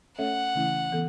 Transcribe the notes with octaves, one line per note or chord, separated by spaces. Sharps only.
A3 C#4 A4 C#5 E5 F#5
C#3 E3 A3 C#4 E4
E3 B3 A4